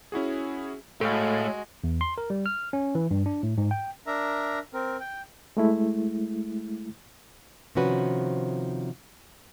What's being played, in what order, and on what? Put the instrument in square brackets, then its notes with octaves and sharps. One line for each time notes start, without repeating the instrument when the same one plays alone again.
[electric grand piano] C#4 E4 F#4 G#4
[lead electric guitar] A2 [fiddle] G#3 F#4 [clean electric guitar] A4 F5
[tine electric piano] E2
C6
A#4
G3
F6
C#4
E3
G2
D4
A2
G#2
G5
[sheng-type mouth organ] D4 A#4 E5 A#5
C4 A#4
G5
[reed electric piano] G#3 A3 E4
[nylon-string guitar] C3 D#3 F3 C#4 F#4 B4